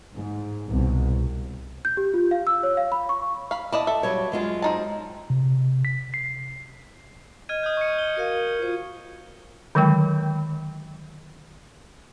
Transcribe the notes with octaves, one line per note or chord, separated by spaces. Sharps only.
G#2
C2 B2
G6
G4
F4
F5
E6
C#5
F5
B5
C#6
F5 B5
E4 D5 D#5 A5
A4 E5
F#3 G3 C#5
F#2 G#3 F4
C4 D#4 A5
C3
B6
C7
D#5 F6 G#6 D#7
D#6 G6
C#6 C#7
G7
F#4 A#4 F5 C#7
F4 C5
D3 D#3 F#3 G#3 G5